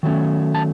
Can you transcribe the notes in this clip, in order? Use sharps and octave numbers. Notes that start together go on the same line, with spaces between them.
D#3 F#3 A3 C#4
A5